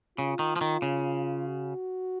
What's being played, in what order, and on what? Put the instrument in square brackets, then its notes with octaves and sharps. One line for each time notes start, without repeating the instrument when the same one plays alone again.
[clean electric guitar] C#3 [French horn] F4
[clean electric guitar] D#3
F3
D#3
C#3
[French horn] F#4